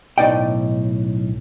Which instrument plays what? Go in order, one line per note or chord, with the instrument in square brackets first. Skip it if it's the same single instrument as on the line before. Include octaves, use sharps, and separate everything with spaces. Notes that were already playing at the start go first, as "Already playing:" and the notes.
[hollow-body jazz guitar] B1 A2 D#4 D5 D#5 G5